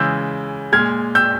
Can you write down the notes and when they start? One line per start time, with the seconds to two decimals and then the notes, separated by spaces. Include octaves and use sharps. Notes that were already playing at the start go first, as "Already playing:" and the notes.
Already playing: C#3 E3 G#3 E6 G6
0.72 A#2 G#3 F6 G#6
1.15 E6 G6